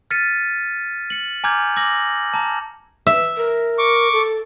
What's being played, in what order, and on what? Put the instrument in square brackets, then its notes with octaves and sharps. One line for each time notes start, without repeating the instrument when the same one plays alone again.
[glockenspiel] F6 A6 B6 C#7 D#7
C#7 F#7
G#5 A#5 D6 F6 G6 G#6
D6 E6 A#6 F#7
A5 A#5
[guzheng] E5
[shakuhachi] A#4
[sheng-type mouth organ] C#6 D6
[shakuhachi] A4